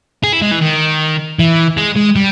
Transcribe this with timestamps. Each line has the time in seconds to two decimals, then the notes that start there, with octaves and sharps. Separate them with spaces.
0.23 G#4
0.33 E4
0.42 G#3
0.51 E3
0.61 D#3
1.39 E3
1.78 G#3
1.96 G#3
2.16 G3